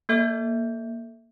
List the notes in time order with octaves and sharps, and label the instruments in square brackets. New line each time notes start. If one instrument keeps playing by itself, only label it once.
[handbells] A#3 A4 E5 G6